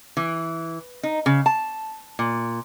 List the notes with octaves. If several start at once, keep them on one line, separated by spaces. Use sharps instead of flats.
E3
D#4
C#3
A5
A#2